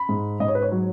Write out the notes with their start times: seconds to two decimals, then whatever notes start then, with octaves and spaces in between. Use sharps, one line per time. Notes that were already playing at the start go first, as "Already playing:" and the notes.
Already playing: B5
0.09 G#2
0.40 G#2 D#5
0.48 C#5
0.55 B4
0.62 C#5
0.71 F#3